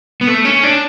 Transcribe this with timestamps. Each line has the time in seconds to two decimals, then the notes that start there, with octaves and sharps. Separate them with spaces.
0.21 B3
0.27 A3
0.45 C#4
0.63 D4